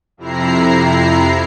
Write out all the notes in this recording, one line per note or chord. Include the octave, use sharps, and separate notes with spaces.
F2 C3 E4 A#5 C7